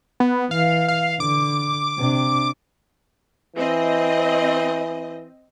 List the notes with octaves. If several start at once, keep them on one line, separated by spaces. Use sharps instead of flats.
B3
E3 F5
F5
D3 D6
C3 D4
E3 C4 D#5